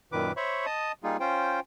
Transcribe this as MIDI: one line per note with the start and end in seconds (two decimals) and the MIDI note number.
0.12 0.32 42
0.12 0.32 46
0.12 0.32 51
0.12 0.32 71
0.12 0.32 86
0.37 0.66 72
0.37 0.66 73
0.37 0.66 76
0.37 0.66 83
0.37 0.66 85
0.66 0.92 75
0.66 0.92 81
0.66 0.92 87
1.04 1.17 55
1.04 1.17 58
1.04 1.17 63
1.04 1.17 65
1.04 1.17 68
1.20 1.60 61
1.20 1.60 65
1.20 1.60 72
1.20 1.60 79